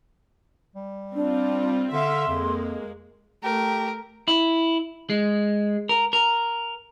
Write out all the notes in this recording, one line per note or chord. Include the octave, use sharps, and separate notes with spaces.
G3
C4 D4 F4
D3 E5 F5 C6
F2 G#3 A#3
A3 G4 A#4
E4
G#3
A#4
A#4